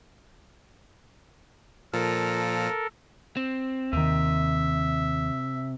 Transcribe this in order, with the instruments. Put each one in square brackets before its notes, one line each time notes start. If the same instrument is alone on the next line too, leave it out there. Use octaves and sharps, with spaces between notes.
[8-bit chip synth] A#2 F3 [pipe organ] A4 A#4
[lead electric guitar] C4
[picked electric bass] D#2 D#3 [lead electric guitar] C3 [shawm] E5